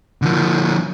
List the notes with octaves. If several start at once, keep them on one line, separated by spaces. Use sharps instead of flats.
D3 F3